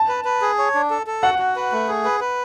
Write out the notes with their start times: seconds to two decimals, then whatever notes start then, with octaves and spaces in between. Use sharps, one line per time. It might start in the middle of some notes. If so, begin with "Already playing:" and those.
Already playing: A5
0.08 B4
0.25 B4
0.42 G#4
0.58 C#5
0.75 D4
0.90 A4
1.07 A4
1.23 F#4 F#5
1.39 F#4
1.56 B4
1.72 A3
1.88 G#4
2.05 B4
2.20 B4